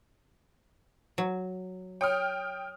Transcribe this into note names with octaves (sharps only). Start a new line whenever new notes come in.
F#3
C#5 G5 D#6 F6